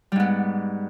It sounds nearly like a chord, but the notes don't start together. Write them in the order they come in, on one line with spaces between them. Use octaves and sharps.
G3 G#2 B3